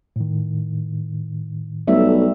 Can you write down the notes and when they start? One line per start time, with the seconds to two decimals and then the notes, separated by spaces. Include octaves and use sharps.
0.16 A2 D#3
1.88 B1 G3 A3 E5